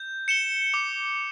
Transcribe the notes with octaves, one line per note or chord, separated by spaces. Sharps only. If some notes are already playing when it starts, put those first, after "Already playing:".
Already playing: G6
C#7 E7 G7
D6